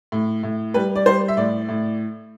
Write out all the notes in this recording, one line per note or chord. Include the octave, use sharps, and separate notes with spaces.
A2
A2
G3 B4
D5
G3 C5
E5
A2 D5
A2